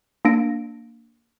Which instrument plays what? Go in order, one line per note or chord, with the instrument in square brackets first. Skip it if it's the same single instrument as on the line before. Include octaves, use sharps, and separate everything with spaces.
[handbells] A#3 D4 A#6 D7